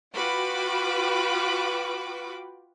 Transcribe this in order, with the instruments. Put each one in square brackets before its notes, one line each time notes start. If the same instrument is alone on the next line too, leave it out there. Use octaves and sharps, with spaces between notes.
[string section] F4 F#4 B4 G5 B5 D6